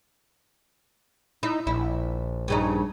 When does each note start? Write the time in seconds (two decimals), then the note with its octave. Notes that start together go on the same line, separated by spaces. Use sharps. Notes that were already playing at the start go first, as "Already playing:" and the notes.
1.43 D#4 E4
1.67 A#1 E4
2.48 G2 C#3 D#4